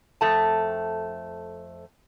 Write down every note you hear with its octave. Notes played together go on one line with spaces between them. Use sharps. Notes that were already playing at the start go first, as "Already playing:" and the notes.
F2 A3 A5